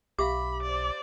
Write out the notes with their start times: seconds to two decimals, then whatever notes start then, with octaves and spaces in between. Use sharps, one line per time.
0.19 B1 G4 E5 F5 B5 D6
0.62 C5 D5